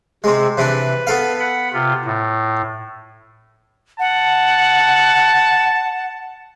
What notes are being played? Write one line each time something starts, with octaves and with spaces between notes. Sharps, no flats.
C3 G#3 C4
C3 E3 D4 B4
B3 A4 F5
F#5 B5
C3 F4
A2
F#5 A5